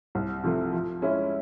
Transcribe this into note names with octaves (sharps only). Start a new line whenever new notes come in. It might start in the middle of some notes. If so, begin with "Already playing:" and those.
C2
C3 F3 A3
F3
G#3 C#4 E4